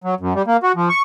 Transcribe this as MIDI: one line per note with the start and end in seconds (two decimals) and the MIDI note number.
0.04 0.15 54
0.20 0.33 42
0.35 0.42 55
0.47 0.57 58
0.63 0.72 66
0.76 0.89 53
0.89 1.02 85